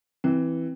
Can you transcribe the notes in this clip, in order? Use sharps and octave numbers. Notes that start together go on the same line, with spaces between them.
E3 C4